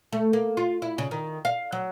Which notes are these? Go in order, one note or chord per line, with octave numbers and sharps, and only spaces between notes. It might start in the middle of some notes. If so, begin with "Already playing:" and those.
A3
A#3
F4
E4
C#3
D#3
F5
F#3